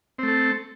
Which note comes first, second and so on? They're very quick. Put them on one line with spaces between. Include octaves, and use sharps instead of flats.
C4 A3 A4